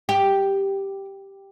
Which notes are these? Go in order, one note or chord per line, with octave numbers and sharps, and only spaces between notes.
G4